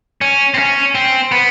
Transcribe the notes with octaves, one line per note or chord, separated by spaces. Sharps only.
C#4
C4
C#4
C4
B3